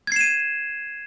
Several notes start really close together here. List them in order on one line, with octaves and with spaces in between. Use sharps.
G#6 C7 E7 D#7